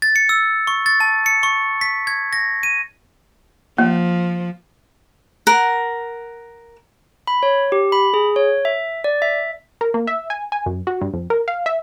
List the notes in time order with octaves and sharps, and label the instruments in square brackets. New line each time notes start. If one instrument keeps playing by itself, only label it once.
[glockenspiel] A6
C#7
E6
C#6
A6
A5
C#7
C#6
B6
G#6
A#6
D#7
[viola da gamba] F3 [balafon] A#3
[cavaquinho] A#4 F#5
[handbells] B5
C#5
G4
B5
G#4
C#5
E5
D5
E5
[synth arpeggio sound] A#4
A#3
E5
G#5
G#5
F#2
F#4
G2
F2
A#4
F5
E5